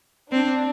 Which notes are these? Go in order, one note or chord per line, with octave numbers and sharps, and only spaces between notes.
C4 D4